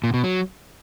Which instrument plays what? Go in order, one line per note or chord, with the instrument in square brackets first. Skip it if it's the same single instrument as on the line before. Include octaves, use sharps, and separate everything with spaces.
[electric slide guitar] A#2
B2
F#3